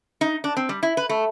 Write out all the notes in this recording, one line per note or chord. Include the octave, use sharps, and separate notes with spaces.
D#4
D4
C4
G3
E4
B4
A3